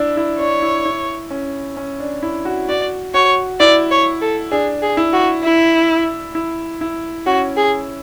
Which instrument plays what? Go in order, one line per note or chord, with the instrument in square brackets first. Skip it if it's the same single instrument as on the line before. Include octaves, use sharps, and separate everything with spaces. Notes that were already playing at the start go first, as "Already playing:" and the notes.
Already playing: [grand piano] D4 E4
E4
[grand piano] D4 [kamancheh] C#5
[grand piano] E4
E4
C#4
C#4
D4
E4
F#4
[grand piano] F#4 [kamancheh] D5
[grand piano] F#4 [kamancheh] C#5
[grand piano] E4 [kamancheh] D5
[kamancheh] C#5
A4
[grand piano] D4 [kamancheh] G#4
[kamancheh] G#4
[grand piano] E4
[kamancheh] F#4
E4
[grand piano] E4
E4
[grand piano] C#4 [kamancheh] F#4
[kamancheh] G#4